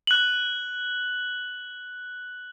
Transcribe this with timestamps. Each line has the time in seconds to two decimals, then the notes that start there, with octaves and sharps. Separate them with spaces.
0.07 F#6 F#7